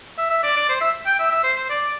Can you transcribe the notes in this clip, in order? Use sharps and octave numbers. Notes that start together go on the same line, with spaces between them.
E5
E5
D5
D5
C5
E5
G5
E5
E5
C5
C5
D5